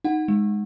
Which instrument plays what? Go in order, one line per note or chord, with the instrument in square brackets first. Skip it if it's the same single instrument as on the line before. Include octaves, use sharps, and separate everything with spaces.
[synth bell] D#4 F#5
G#3